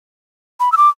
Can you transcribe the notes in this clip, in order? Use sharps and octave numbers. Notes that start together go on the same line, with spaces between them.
B5
E6
D6